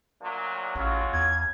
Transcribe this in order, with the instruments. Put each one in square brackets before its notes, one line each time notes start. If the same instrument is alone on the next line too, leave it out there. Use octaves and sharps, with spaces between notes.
[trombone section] D2 A#2 F#3
[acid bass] A1 [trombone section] F#3 G#3 F4
[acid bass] E2 [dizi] G#6